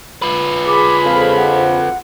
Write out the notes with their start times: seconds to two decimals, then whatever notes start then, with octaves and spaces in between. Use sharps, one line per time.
0.22 F4 B4
0.66 G#4 B5 D6
1.05 F2 F5
1.37 F#5